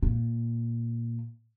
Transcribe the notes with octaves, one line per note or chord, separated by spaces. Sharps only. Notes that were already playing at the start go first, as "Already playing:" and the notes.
A#2